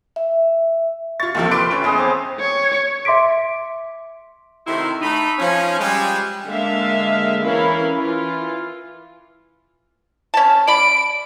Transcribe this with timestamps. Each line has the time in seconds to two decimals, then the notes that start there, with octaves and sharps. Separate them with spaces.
0.16 E5
1.20 F4 C#6 A6
1.35 D#2 C3 F3 F4 A4 G5
1.51 B4 C6 D6 D7
1.71 A3 C#4
1.84 E2 G#4 D#5 D#6
1.98 C4 C5 D6
2.40 C#5
3.05 E5 C6 D6 B6 D7
4.67 C3 D#3 A3 E4 F#4 C6
5.02 A3 D#4 B5
5.39 F3 C#4
5.80 G3 G#3
6.46 D3 G#3 A#3 E5 F5
7.43 E3 C#4 E4 A#4 F5 B5
7.93 E3 F4
10.34 C#4 A5
10.67 D5 B5 D7